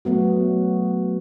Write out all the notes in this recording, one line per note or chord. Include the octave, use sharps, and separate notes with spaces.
F#3 A3 B3 F#4